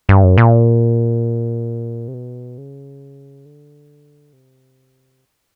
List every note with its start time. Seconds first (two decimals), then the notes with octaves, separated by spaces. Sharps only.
0.09 G2
0.24 F#2
0.38 A#2
2.08 C3
2.14 B2
2.58 C#3
3.45 D3
4.33 C3